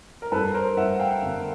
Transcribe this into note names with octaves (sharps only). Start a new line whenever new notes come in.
A#4
G2 A4 B4
A#4 C5
G2 E5 F#5
F5 G5
G1